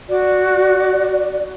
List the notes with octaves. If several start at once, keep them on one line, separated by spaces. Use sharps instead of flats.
F#4 D5